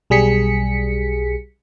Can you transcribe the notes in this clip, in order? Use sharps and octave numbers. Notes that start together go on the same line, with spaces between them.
B1 G3 G#4 B6 C#7